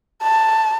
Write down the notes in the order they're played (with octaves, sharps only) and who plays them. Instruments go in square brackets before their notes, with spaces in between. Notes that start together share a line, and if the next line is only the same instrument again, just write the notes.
[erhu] A5